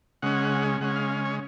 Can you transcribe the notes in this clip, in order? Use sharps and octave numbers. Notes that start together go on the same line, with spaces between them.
C#3 G#3 C#4 F#5
C#3 G#3 C#4 F#5
F5
F5
C#5